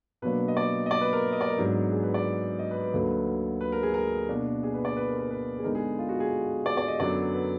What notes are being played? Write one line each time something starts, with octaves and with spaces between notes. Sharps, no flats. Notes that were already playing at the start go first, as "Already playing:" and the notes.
B2 F#3 A#3 D4 B4
D#5
D5
D#5
D5
B4
A#4
D#5
D5
A#4
G#2 F#3 B3 D4
G#4
B4
D5
D#5
B4
B4
D2 D3 F#3 A#3 D#4 B4
B4
A#4
G#4
A#4
B2 A#3 D4
G#4
B4
D5
B4
A#4
B4
B4
G#4
D3 G#3 B3 D#4 A#4
G#4
F4
F#4
G#4
D5
D5
D#5
F#2 D3 F#3 B3 D5
B4